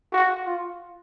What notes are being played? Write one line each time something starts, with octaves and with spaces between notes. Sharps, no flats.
F#4
F4